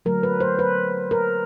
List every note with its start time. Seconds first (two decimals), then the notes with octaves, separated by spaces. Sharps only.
0.05 D3 F#3 A3 A#4
0.23 B4
0.40 C5
0.59 B4
1.11 A#4